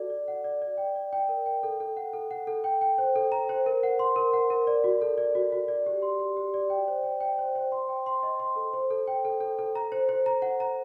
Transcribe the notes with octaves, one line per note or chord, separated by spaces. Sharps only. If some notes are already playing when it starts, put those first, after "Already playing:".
Already playing: F#4 A4 D5
D5
F#5
D5
D5
G5
D5
G5
A#4
G5
A4
A4
F#5
A4
F#5
A4
G5
G5
C5
A4
A#5
C5
A#4
F#5
C6
A#4
F#5
A#4
D5
F#4
A4
D5
F#4
F#4
D5
G4
C6
G4
G4
D5
G5
C5
G5
G5
C5
C5
C6
G5
C6
D#5
C6
A4
C5
A4
G5
A4
A4
A4
A#5
C5
C5
A#5
F#5
A#5